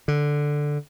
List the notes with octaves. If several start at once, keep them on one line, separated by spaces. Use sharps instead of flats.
D3